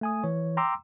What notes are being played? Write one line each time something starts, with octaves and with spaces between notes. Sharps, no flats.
A3 G#5 D#6
E3 C#5
G5 A#5 C6 D6 E6